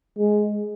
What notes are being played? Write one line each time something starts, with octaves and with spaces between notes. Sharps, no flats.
G#3